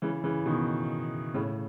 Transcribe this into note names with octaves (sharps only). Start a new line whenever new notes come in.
C#3 E3
C#3 E3
B2 D#3
A2 C#3